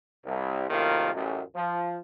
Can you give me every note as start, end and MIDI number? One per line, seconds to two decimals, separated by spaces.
0.25 0.65 36
0.70 1.11 42
0.70 1.11 45
0.70 1.11 48
0.70 1.11 51
0.70 1.11 58
0.70 1.11 65
1.13 1.42 33
1.13 1.42 42
1.55 1.98 53